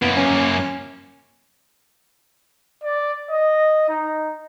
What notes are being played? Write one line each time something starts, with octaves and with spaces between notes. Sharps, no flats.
F#2 A#3 B3
C#4
D5
D#5
D#4